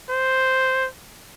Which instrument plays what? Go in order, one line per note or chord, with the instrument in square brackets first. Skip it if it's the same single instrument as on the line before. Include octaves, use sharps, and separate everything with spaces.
[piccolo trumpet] C5